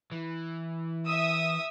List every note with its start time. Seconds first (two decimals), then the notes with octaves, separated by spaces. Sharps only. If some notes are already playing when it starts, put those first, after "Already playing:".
0.12 E3
1.06 E5 D#6 E6